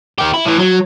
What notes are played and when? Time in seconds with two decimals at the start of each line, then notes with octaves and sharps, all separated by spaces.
0.18 D#3 G4
0.34 E4
0.45 A2 E3
0.59 F#3